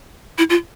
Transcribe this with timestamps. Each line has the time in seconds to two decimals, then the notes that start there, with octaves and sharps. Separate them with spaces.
0.38 E4
0.50 F4